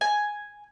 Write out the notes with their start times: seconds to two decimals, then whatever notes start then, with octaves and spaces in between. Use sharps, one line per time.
0.01 G#5